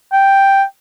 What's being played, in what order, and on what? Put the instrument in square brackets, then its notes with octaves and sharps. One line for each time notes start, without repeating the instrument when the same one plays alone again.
[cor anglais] G5